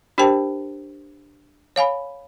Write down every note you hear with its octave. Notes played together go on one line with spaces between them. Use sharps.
D4 G4 A#4 C5 G5 A5
C#5 F5 G#5 B5